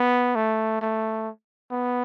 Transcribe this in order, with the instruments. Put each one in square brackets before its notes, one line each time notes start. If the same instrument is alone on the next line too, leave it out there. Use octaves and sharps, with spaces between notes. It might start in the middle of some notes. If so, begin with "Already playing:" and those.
Already playing: [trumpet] B3
A3
A3
B3